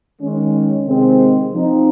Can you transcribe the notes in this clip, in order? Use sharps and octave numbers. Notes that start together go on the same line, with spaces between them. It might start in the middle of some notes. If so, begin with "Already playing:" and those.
D#3 G#3 C#4
C3 D#3 G#3 C4
F3 C4 D#4